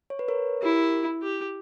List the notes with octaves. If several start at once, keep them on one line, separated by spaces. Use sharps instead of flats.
C#5
B4
A#4 C#5
E4 G4 A#4
G4